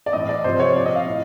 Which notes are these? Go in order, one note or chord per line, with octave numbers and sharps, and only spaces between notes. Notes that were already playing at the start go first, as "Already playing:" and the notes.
D5
A2 E3 D#5
D5
C3 F3 C5
C#5
A#2 F3 D5
D#5
F5
A2